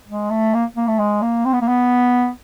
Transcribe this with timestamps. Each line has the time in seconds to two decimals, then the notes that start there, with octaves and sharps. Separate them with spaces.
0.08 G#3
0.30 A3
0.54 A#3
0.77 A#3
0.87 A3
0.99 G#3
1.22 A#3
1.45 C4
1.53 B3
1.61 A#3
1.68 B3